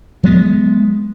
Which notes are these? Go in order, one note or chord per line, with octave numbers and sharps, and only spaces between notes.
F#3 G#3 B3